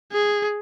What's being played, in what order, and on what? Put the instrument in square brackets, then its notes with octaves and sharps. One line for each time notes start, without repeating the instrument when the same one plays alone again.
[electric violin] G#4